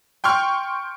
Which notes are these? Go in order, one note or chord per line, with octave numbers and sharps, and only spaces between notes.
G5 C6 C#6 F6